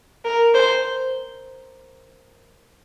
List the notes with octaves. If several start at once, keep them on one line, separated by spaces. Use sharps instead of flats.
A#4
C5